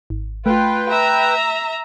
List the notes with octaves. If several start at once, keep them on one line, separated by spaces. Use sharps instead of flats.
G#1
A3 F4 B4 G5
E5 A#5